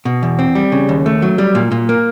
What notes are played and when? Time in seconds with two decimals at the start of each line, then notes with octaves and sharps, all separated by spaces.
0.05 B2
0.23 E2
0.39 C4
0.55 G3
0.72 C#3
0.89 D#2
1.06 A3
1.22 F#3
1.38 G3
1.55 A#2
1.72 A#2
1.89 A#3